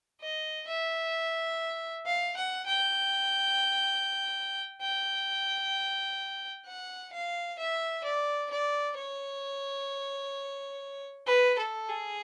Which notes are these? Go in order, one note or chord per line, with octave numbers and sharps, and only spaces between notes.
D#5
E5
F5
F#5
G5
G5
F#5
F5
E5
D5
D5
C#5
B4
A4
G#4